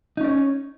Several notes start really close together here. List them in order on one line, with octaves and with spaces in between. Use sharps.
D#4 C#4 D5 C#5